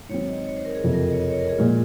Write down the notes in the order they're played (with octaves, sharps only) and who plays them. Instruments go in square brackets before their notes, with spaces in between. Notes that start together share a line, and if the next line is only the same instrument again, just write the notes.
[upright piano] G#2 D#3 F#3 C4 [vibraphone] C#5
[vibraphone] D#5
C#5
C5
A#4
G#4
[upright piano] F#1 F2 C3
[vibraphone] A#4
D#5
C#5
D#5
C#5
A#4
G#4
[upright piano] A#2 F3 G#3 [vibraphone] F4